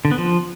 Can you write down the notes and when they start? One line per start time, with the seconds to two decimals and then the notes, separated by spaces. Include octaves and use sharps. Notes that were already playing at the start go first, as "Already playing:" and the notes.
0.05 D3
0.11 B3
0.18 F3